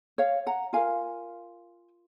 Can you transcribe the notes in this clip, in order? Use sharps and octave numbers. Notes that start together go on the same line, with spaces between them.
C#5 F5
F#5 A#5
F4 A#4 F5 G#5